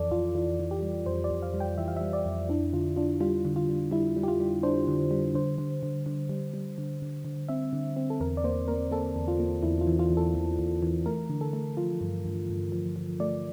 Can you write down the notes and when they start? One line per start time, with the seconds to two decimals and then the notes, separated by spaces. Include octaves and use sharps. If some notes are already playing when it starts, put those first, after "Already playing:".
Already playing: F2 E3 A4 D5
0.11 F2 F4
0.35 E3 F4
0.59 E3
0.71 G4
0.82 G3
1.06 F2 C5
1.24 D5
1.30 F2
1.42 F5
1.54 G3
1.60 G5
1.78 E3 E5
1.88 F5
1.97 G3 E5
2.13 D5
2.25 F2
2.49 D4 E4
2.73 D3 F4
2.96 D4 F4
3.20 G3 F4
3.45 D3
3.56 F4
3.69 G3
3.91 G3 E4
4.16 G3
4.23 G4
4.28 F4
4.40 G3
4.63 D4 C5
4.87 D3
5.11 G3
5.34 D3 C5
5.58 D3
5.83 D3
6.06 D3
6.29 G3
6.54 G3
6.78 D3
7.02 D3
7.25 D3
7.49 C4 E5
7.73 D3
7.97 C4
8.10 A4
8.20 E2 A#4
8.37 D5
8.44 A#3 C5
8.68 A#3 A#4
8.92 A#3 A4
9.16 E2
9.28 F4
9.40 A#3
9.63 E2 E4
9.81 F4
9.87 E3
9.99 F4
10.11 E2
10.17 A4
10.35 E2
10.59 E2
10.83 E3
11.06 A3 A#4
11.29 D3
11.41 A4
11.53 A3
11.77 F3 F4
12.01 G2
12.25 G2
12.49 G2
12.72 F3
12.96 F3
13.20 A3 D5